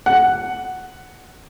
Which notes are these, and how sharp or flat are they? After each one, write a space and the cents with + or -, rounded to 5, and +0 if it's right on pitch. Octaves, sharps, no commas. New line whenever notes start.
F#5 +5